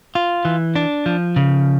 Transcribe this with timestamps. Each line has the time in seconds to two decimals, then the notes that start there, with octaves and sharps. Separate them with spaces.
0.15 F4
0.45 E3
0.76 D4
1.06 F3
1.36 C#3